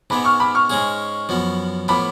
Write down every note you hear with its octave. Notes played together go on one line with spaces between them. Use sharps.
G#2 G#3 B3 B5 D6
C#6 F6
B5 D6
C#6 F6
G#2 G#3 C#4 G#4
F#2 F3 B3
A2 F3 B3 B5 D6